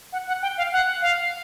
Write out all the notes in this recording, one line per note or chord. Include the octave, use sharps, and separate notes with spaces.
F#5
F#5
G5
F5
F#5
F5